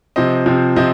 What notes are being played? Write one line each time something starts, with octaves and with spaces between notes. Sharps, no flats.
C3 F3 C4 D#5
C3 F3 C4
C3 F3 C4 D#5